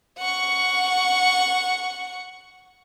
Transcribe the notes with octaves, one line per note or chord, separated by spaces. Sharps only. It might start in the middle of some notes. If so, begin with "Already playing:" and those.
F#5 C#6